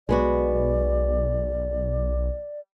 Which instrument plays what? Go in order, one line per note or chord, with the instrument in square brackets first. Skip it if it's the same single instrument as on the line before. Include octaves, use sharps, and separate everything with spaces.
[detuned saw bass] B1 [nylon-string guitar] G#3 B3 F#4 [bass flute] D5